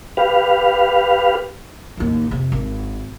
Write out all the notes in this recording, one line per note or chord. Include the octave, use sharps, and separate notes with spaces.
G4 B4 F5
A1 D#2
F2 C3
G#1